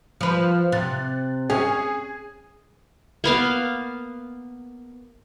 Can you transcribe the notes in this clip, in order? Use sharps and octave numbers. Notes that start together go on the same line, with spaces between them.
F3 B4
C3 F#6 A6
C#4 G#4 G#6
A#3 B3 F5